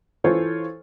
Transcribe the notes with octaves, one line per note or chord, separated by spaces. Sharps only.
E3 F4 A4 C5 C#5